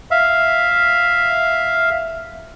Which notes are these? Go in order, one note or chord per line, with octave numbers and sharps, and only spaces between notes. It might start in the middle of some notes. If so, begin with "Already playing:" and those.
E5 F5